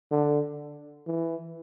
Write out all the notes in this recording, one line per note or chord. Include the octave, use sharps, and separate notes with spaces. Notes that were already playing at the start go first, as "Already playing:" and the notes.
D3
E3